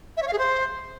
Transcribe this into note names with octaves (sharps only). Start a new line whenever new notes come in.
E5
C#5
F5
G#4
C5